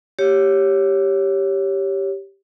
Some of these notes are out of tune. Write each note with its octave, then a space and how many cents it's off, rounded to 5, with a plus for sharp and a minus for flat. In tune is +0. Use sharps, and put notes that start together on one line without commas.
G4 +0 C#5 +0